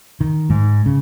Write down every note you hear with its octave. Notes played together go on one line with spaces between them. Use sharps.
D#3
G#2
C#3